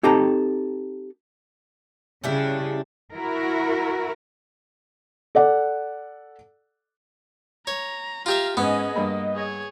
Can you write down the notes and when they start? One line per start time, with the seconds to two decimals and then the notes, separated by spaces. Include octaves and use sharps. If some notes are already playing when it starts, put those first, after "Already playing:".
0.03 C4 D#4 G4 A4 A5 A#5
2.24 C#3 G3 D4 E4
3.15 E4 F#4 A#4
5.35 A4 D5 F#5
7.67 C#5 A#5
8.26 F4 G4 E5 F5 A#5
8.57 G#2 B3 C#4 G#4 D#5
8.96 G2 A#3 B5
9.34 G#4 C#5